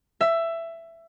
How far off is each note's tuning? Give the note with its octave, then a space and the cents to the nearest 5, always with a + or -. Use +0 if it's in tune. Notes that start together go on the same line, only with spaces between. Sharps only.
E5 +15